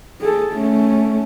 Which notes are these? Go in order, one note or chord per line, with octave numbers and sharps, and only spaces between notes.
G#4 A4
A3 C#4